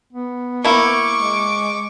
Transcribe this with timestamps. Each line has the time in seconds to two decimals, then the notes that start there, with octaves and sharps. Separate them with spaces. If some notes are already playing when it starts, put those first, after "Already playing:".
0.13 B3
0.65 A#3 E4 C#6 D6
1.16 G#3